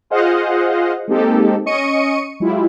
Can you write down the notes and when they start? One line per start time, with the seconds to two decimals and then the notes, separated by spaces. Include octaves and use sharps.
0.10 F4 G#4 C5 D#5 F5 F#5
1.08 G#3 A#3 C4 D#4 G4 A4
1.66 C#4 D#5 C#6 C#7 D#7
2.40 F#3 G#3 E4 F4 G4